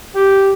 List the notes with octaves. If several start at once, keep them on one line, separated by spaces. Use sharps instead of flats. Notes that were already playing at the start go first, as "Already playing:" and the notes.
G4